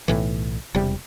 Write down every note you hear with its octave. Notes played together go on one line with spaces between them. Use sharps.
B1 A2 E3
E1 C3 G3